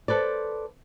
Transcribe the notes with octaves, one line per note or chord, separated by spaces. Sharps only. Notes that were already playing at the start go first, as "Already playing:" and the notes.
A4 B4 C5 D5